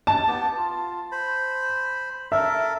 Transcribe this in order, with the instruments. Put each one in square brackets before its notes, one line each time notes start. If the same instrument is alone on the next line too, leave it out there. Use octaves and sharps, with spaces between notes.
[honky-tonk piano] A5
[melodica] B3 G4
F4
C5 B5
[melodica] A4 A#4 [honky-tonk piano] E5